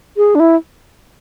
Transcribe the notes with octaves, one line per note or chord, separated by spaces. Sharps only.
G#4
D4
E4